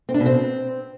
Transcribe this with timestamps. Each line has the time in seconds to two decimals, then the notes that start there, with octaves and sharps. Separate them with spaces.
0.09 C4
0.14 D4
0.20 B2
0.26 C4